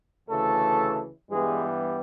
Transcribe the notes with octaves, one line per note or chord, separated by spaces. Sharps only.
D2 C#3 E3 A3 A4
G2 E3 G3 G#3 B3 G#4